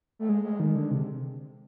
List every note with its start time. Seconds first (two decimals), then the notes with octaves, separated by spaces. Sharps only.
0.19 A3
0.29 G#3
0.44 G#3
0.60 D#3
0.75 D3
0.91 C3